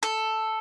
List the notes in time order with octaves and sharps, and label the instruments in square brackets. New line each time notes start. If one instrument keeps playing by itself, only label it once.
[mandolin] A4